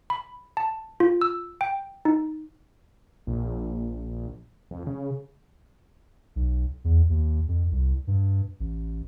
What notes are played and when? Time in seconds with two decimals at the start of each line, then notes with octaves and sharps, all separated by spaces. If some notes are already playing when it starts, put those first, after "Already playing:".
0.10 B5
0.57 A5
1.00 F4
1.21 E6
1.61 G5
2.05 D#4
3.27 A#1
4.71 F2
4.87 C#3
6.36 B1
6.84 E2
7.09 D#2
7.48 F2
7.71 C2
8.07 G2
8.60 A1